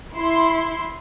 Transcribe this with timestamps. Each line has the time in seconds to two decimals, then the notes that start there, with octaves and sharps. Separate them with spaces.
0.15 E4 C6